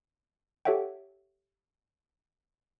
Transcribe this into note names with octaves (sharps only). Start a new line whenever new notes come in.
G4 A4 C#5 E5 F#5 G5